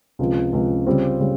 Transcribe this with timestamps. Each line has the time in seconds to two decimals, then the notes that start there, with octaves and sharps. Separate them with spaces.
0.19 C#2 C3 F3
0.53 C#2 C3 F3
0.86 C#3 G3 C4 F4
1.20 C#3 G3